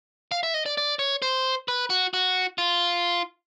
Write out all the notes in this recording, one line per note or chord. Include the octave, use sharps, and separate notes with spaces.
F5
E5
D#5
D5
D5
C#5
C5
B4
F#4
F#4
F4